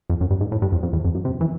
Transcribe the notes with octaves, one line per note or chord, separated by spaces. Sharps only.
F2
F#2
G2
G#2
A2
G2
F2
F2
E2
F2
F#2
C3
E3